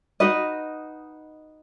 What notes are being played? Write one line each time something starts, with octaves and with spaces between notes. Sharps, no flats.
D#4 F#4 B4 D#5